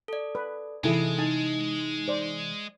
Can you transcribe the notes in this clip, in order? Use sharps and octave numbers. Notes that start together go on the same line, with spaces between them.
A4 D5
B4
C3 E3 G#3 D#4 E4 G#4 A4 G#5
D#4 G#5
C5 D5